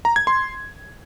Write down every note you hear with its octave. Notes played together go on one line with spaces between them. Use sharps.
A#5
G#6
C6